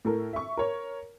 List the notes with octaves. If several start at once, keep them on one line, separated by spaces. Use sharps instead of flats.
A2 A4 A#4
E5 C#6
A#4 C#5